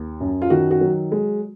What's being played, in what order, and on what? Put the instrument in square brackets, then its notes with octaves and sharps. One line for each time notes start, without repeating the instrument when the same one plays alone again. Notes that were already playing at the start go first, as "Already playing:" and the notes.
Already playing: [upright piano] D#2
F#2
F4
D#3 F#4
F#4
F#3
G#3